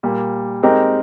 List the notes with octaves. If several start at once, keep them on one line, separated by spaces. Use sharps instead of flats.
A#2 G3 A#3
G#3 C4 D#4 G4 A#4